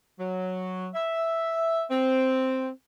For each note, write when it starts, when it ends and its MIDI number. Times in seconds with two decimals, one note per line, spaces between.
0.19 0.87 54
0.94 1.83 76
1.90 2.69 60